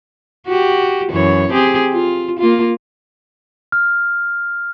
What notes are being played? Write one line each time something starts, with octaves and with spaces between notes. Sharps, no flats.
F#4 G4
F#2 E3 C#5
C4 G4 G#4
F4
A#3 F4
F6